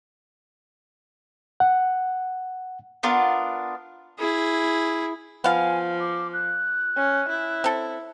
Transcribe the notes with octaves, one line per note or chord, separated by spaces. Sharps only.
F#5
B3 D4 F4 A#4
E4 G#4
F3 B3 F5 G#5
D6
F#6
C#4
E4
C4 A4